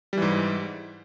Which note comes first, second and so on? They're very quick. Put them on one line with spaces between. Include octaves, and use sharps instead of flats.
G3 E3 G#2